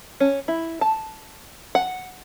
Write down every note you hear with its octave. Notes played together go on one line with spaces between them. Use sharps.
C#4
E4
A5
F#5